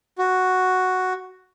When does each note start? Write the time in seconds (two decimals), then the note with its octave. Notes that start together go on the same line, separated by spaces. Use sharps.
0.18 F#4